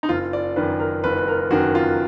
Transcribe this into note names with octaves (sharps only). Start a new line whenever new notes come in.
D#4
F#1 F4
D5
F#2 D#3 B4
A#4
F#1 B4
B4
A#4
F#2 D#3 F#4
F4